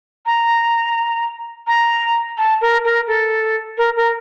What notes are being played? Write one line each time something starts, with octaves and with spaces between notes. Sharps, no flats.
A#5
A#5
A5
A#4
A#4
A4
A#4
A#4